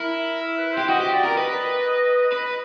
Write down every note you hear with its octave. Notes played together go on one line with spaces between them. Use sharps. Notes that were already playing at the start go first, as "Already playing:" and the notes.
Already playing: E4 A#4
E5
B4
G4 C5
F#4 D#5
G4
D5
A#4
B4 D#5
B4